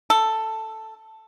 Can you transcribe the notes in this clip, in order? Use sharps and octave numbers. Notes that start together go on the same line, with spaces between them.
A4